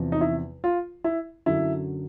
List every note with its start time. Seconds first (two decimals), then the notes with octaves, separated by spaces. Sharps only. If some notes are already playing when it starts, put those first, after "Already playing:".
Already playing: E2 C3 F3
0.12 D#4
0.21 E4
0.64 F4
1.04 E4
1.46 F#2 D3 F#3 E4